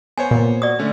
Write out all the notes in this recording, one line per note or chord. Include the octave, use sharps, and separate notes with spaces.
B3 C5 C#5 G#5
A#2
F#4 D5 D#6
D3 A3 C#4